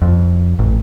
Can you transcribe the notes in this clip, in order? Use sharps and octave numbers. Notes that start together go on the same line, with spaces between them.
F2
A1